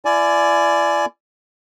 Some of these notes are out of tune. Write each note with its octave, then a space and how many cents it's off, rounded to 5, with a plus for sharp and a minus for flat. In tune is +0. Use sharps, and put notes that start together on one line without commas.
E4 +40 D5 +0 G#5 +20